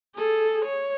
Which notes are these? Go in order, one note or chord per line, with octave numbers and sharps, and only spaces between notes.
G#4 A4
C#5